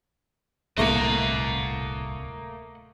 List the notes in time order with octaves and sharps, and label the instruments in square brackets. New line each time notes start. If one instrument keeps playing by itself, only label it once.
[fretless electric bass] D1 C2 [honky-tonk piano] A3 A#3 A#4 [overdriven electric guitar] D#5 F#5